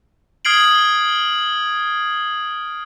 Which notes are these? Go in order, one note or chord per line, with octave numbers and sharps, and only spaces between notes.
D#6 F6 G#6 C7 D7 F#7